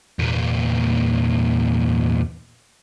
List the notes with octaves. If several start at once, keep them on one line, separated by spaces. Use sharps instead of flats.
E2 A#2